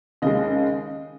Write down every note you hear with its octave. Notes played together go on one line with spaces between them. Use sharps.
D#2 C#3 G#3 D#5